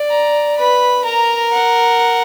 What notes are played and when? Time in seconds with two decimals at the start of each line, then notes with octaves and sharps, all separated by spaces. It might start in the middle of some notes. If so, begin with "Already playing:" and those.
Already playing: D5
0.10 A#5
0.57 B4 B5
1.04 A#4 A#5
1.52 F#5